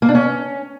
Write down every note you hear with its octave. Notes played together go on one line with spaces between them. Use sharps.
A#3
D4
C#4